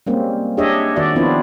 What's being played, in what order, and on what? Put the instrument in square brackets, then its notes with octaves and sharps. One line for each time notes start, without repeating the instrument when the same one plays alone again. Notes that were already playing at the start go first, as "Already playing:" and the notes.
[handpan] G3 G#3 A#3 C4 C#4
D4 G4 G#4 C#5 D#5 E5
D#3 F#4 D5 E5
F3 B3 C4 D4 E4 F4